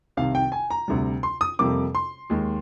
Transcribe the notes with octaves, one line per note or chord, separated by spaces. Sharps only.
C2 C3 D#3 F5
G5
G#5
A#5
D2 C3 G3
C6
D#6
F2 C3 G3 A#3 D6
C6
D#2 D#3 G#3